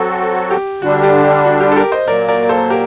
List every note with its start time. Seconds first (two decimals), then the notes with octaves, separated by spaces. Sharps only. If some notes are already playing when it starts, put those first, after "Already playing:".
Already playing: F#3 C4 F#4 A4
0.51 G4
0.82 D3 G3 D4 F#4
1.03 G4
1.24 G4
1.45 F#4
1.60 G4
1.72 A4
1.76 G4 A#4
1.92 C5 D#5
2.07 A#2 F#3 A#3 A#4 D5
2.28 A#4 D5
2.43 D5
2.49 A4 C5
2.70 G4 A#4